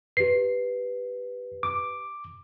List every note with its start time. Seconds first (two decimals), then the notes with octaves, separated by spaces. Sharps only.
0.17 G4 B4 C7
1.63 D6